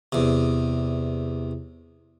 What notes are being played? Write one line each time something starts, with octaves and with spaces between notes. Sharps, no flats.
E2 C3